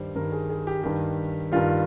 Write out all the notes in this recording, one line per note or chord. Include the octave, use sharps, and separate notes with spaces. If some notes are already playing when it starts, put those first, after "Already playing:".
Already playing: G2 D#3 G3 C5
G2 D#3 G3 A#4
G#4
G#4
G4
G2 D#3 G3 G4
G2 D#3 G3 F4